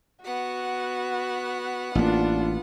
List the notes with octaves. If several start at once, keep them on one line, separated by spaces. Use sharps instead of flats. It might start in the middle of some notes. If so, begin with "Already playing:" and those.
B3 F#4 F#5
A1 A#3 D4 F4